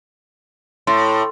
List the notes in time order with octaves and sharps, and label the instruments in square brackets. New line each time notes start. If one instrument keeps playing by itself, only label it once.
[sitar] A2 [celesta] C6